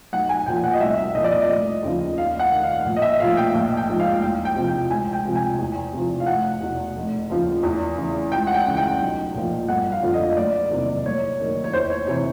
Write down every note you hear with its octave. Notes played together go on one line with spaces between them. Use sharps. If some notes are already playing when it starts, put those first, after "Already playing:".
B1 F#5
G#5
A#2 F3 G5
F#5
D#5
C2 E5
E5
A#2 F3 D#5
D5
D#5
F1
D#2 C#3 F3
D#2 F5
F#5
D#3
F5
A#1
D#5
E5
A#2 F3 F5
G5
A#1
G5
G#2 F3
F5
E2 G5
G5
C3 F3
G5
C#2 G#5
G5
C3 F3
G#5
E2
C3 F3
F5
F1 F#5
E2 B2
F1
D#2 C#3 F3
E2
C#3 E3
C#2 G5
F#5
G5
C#3 E3
G5
B1
A#2 F3
G1 F#5
F5
F2 D3 F3
D#5
F#1 D5
E2 C3 D#3
F#1 C#5
F#2 D#3
C#5
E2 C5
C#5
C3 E3 C#5